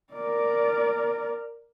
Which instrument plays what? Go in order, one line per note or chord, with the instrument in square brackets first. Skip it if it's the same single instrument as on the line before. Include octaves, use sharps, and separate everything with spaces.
[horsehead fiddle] A#4 D5